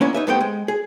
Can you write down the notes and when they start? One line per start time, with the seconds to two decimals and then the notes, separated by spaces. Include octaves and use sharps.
0.01 A#3 B3 C#4 D4 E4
0.14 D#4 B4 E5
0.27 G2 A3 B3 C4 B4 G5
0.41 G#3
0.68 G#4